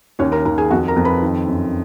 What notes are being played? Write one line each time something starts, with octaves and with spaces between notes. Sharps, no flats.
D#2 C#4 C#5
A#4 A#5
D#2 A#4 A#5
G#4 G#5
F2 F#4 F#5
A#4 A#5
F2
B4 B5
D#3
F#2